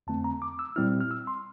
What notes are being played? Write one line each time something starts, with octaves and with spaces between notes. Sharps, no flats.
F2 D3 A3 C4 A5
A#5
D6
E6
A#2 G3 C4 E4 F6
F6
E6
C6